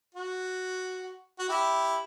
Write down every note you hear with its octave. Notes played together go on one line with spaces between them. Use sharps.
F#4
F#4
E4 G4